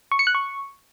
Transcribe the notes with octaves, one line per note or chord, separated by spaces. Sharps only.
C#6
C#7
F#6
C#6